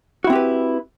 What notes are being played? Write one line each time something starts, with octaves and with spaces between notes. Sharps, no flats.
C4 E4 F#4 G4 B4